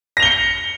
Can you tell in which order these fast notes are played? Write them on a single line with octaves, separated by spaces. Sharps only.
A#6 F7 G7 C#7